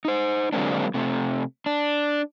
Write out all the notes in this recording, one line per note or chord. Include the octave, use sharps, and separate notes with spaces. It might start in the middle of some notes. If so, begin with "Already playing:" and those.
D#4 C5
D3 F#3 G#3 A#3 C4 D4
C3 A3
D4